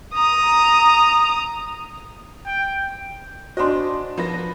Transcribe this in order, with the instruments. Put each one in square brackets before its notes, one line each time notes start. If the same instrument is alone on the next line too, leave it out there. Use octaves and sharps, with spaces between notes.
[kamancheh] A#5 D#6
[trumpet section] G5
[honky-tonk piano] D4 D#5 [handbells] F#4 D5 [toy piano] C5 G#5 C6
[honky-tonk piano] F3 B4 A#6